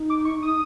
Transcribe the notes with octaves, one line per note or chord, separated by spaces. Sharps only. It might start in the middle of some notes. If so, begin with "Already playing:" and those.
Already playing: D#4
D6
C#6
D#6